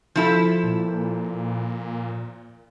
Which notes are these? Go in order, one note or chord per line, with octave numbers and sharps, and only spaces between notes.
F3 E4 A4
A#2